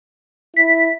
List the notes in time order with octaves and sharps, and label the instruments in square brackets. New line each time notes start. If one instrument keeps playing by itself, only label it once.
[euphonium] E4 [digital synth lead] B6